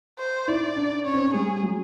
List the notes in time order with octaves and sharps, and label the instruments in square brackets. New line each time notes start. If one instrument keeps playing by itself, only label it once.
[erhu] C5
[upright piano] E4 [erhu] D5
[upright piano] D4
[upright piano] C#4 [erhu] C#5
[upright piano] C4
C#4
[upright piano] G3 [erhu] G#4
[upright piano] F#3